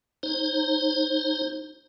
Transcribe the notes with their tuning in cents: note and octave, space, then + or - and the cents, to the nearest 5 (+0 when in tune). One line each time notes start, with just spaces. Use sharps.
D#4 -10 C5 +30